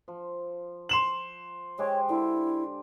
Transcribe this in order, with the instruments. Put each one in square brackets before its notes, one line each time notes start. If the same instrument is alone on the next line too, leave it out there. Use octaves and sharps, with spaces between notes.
[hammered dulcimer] F3
[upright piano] C6 E7 F#7
[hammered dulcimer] G#3 G4 C5 [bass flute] C#5
[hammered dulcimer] D3 [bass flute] E4